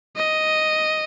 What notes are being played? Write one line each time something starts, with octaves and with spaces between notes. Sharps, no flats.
D#5